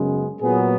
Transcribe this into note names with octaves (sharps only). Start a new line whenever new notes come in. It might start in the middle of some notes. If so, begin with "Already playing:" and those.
Already playing: F#2 C#3 G#3 B3
A#2 F#3 B3 G#4